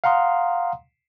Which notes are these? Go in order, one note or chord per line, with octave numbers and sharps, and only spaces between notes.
F5 F#5 A#5 C6 D#6